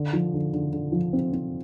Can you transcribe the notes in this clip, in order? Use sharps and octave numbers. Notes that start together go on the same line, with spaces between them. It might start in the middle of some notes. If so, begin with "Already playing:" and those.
Already playing: D3
F3
D3
D3
D3
F3
C4
C4